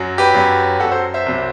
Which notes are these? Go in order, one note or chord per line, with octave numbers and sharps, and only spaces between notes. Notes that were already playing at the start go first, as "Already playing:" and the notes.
Already playing: F#2 F#3
G4 B4
F#2 F#3
F#2 F#4 A4
F#3
A4 C5
C5 E5
C2 C3 F#3